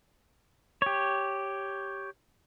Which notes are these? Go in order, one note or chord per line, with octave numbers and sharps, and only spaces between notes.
G4 C#5